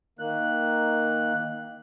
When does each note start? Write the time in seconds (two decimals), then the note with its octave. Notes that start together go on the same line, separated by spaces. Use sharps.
0.19 D#3 A#3 F#6